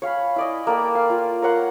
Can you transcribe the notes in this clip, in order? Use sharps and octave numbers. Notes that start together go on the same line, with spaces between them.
C#5 F5 G#5 B5
E4 D5 D#5
A#3 A4 D5 G5
F5
F4
A#4 C#5 F#5 C6